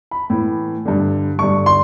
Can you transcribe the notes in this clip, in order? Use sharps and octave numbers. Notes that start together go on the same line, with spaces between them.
B5
A2 E3
G2 D3
G2 D3 C#6
C6